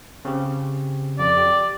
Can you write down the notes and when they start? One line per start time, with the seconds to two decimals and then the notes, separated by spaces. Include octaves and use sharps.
0.25 C#3 C4 G4
1.19 F2 D5
1.37 G4